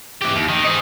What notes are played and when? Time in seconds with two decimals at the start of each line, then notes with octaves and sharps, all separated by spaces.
0.22 E3 G4
0.36 D#2
0.49 D#3
0.64 D#4 G#4